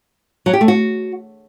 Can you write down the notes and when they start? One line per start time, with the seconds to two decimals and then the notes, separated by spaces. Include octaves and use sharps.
0.46 F#3
0.53 G4
0.61 A3
0.68 F#4